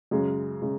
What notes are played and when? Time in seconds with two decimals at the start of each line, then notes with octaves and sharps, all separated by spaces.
0.11 F#2 C#3 G#3
0.62 C#3 G#3